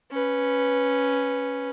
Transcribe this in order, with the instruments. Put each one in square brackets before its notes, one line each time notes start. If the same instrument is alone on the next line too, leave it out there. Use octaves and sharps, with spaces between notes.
[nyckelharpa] C#4 B4